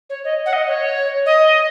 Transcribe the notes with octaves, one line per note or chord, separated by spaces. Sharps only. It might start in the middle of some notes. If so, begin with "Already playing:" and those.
C#5
D#5
F#5
D#5
C#5
D#5